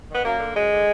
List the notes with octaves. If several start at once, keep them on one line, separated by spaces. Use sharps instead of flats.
D#3
B3
F#2 A#3
D3
F#2 G#3
D3